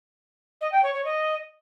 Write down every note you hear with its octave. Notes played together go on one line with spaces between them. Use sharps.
D#5
G5
C#5
C#5
D#5